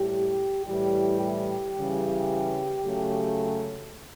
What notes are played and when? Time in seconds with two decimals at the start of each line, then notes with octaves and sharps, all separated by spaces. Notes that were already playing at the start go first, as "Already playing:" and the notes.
Already playing: A2 G3 G4
0.66 A2 E3 G3 G4
1.21 G4
1.76 C#3 E3 G3
2.85 C#3 F#3 A3